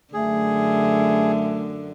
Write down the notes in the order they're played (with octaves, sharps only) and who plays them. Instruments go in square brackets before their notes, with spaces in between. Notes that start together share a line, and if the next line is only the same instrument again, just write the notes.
[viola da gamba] F#2 D3 [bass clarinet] A3 [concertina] G#4